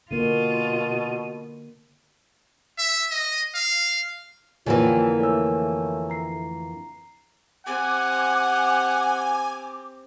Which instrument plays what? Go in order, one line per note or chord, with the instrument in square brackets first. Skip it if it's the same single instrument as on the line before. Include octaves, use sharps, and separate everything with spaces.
[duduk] B2 [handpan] D3 A#3 [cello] F4 [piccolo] D#7
[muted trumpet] E5
D#5
F5
[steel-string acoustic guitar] F2 A#3 G4 [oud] D3 E3 [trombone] F4 [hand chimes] C#5 G#5
[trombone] A3 [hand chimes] C#5 G#5 E6
[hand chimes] A#5 C7
[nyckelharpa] C4 G4 [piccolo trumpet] F#5 [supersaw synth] G#5 [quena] D6